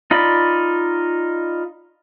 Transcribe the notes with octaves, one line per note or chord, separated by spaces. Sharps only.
D#4 F4 D5 B5